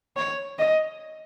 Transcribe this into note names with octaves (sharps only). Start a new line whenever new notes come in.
C#5
D#5